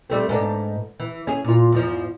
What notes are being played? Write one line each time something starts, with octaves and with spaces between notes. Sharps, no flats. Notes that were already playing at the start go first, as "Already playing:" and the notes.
G3 A3 C4
G#2 B3 D4
E3
C#4 G#4
A#2 F4
E2 G#2 F3